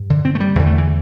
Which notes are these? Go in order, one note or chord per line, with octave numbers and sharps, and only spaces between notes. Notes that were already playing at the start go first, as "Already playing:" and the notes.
Already playing: G2
D3
C4
A3
G3
E2 D3 E3
A3
E3